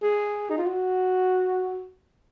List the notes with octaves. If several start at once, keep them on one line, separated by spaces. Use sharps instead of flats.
G#4
D#4
F4
F#4